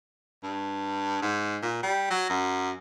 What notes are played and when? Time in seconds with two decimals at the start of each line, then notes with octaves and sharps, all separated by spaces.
0.43 G2
1.22 G#2
1.62 A#2
1.83 G3
2.11 F#3
2.29 F#2